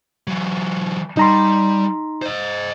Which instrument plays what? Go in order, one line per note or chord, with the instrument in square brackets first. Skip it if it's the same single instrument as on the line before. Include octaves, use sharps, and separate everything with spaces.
[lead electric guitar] E3 F#3
[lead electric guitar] G3 [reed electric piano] D#4 A#5 C6
[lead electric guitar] C5 D#5